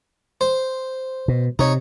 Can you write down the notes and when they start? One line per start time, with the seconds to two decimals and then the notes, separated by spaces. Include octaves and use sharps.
0.41 C5
1.28 B2
1.59 C3 D#4 C#5